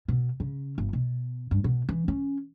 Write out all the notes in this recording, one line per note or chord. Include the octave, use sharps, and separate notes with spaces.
B2
C#3
G1
B2
G2
B2
E3
C#4